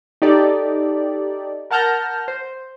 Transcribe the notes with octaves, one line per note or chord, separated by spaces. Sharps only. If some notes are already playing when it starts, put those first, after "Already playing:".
D#4 G4 A4 D5
A#4 F#5 A5 F6 G6 A#6
C5